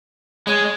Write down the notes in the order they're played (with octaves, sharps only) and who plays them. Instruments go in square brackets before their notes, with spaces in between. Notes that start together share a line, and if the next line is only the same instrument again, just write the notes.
[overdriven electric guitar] G#3 [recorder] C#5